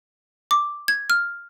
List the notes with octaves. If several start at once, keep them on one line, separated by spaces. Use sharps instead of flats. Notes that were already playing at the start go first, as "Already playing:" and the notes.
D6
G#6
F6